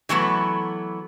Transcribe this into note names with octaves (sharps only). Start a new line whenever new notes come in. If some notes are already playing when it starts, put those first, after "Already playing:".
E3 F#3 A3 B3